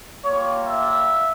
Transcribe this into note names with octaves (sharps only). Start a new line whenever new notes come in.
G3 A#3 F4 C#5
E5